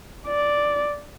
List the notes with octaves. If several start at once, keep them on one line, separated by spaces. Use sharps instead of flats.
D5